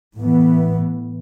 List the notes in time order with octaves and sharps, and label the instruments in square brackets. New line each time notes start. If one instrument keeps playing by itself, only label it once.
[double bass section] A2 E3 B3